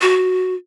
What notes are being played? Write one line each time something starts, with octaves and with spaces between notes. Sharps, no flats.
F#4